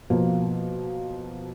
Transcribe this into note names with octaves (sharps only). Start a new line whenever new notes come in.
B2 F3 A#3